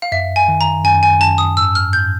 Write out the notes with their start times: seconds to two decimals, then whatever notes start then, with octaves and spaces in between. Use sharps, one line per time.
0.02 F5
0.12 F#2 E5
0.36 G#5
0.48 D#3
0.61 A#5
0.84 F#2 G#5
1.03 G#5
1.20 F#2 A5
1.38 D#6
1.56 G#2 E6
1.75 F6
1.93 G#2 G6